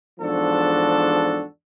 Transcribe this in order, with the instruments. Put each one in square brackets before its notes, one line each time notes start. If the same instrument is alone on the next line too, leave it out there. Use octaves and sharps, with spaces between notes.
[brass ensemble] E2 G#2 F3 D4 F#4 A4